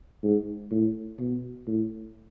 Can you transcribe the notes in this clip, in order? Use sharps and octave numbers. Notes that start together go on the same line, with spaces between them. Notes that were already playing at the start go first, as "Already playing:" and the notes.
G#2
A2
B2
A2